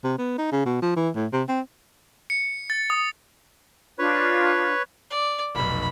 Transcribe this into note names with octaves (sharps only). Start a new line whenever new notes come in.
C3
B3
D#4
C#3
B2
F3
E3
A2
C3
C4
C#7
A6
D#6
D4 F4 B4 C#5
D5
F1 B1 B5